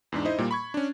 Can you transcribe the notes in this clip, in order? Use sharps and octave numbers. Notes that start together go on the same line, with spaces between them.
E2 G#2 D4
D#4 E4 C5 D#5
A#2 G3 A#3
B5 C#6 G#6
C#4 D4